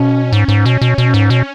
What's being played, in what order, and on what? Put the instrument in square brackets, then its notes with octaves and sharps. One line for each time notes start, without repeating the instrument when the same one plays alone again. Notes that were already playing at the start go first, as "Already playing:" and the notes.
Already playing: [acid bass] B2 [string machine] C#4
[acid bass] G#2
G#2
B2
B2
B2
G#2
B2